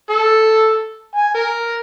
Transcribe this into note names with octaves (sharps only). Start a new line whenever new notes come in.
A4
G#5
A#4